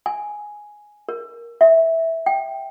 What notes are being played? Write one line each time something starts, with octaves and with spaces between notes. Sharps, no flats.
G#5
A#4
E5
G5